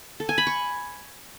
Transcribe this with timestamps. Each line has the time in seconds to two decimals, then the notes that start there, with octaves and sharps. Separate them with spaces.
0.20 A4
0.29 G#5
0.38 B5
0.47 C#6